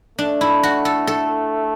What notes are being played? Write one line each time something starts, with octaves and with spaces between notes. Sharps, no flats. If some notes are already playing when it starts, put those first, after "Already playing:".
A3 D4
E4
F#4
A4
A4